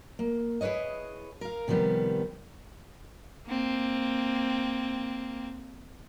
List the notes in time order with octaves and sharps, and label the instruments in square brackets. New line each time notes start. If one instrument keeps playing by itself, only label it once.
[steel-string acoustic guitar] A#3
E4 G#4 B4 C#5 D#5
A#4 F5
C3 D#3 F3 G3 B3
[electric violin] A#3 C4